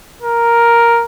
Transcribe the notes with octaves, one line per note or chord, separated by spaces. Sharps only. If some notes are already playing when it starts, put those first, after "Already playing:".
A#4